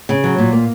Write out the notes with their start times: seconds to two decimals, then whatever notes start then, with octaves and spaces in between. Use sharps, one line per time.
0.09 C#3
0.24 F#3
0.38 A#2
0.53 A#3